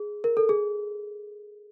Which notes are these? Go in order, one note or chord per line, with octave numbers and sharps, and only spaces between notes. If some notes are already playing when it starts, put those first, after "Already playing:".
Already playing: G#4
A#4
A4
G#4